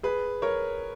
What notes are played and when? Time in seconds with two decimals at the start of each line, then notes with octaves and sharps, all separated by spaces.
0.03 G#4 B4
0.42 A#4 C#5